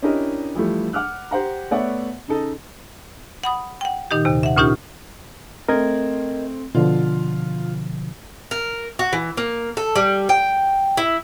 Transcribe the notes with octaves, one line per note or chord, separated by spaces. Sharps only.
C#4 D4 E4 G4 A#4 D#5
E3 F3 G3 A3
F#5 D6 F6 F#6
G4 C5 F#5 A#5
A3 B3 C#5 D5 E5 F#5
C#3 D#4 A4 D#5
F#5 B5 D#6
F#5 G5
A#2 D#3 D#4 G4
D#2 C3
E5 F#5
D2 A#2 C#4 D#4 F4 G4
A3 C4 A#4 D#5 G#6
B2 D3 F3 F4
A#4
F#4
E3
A#3
A4
G3
G5
E4